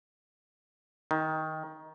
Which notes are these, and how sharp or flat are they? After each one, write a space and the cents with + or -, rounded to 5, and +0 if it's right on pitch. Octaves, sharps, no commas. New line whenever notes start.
D#3 +15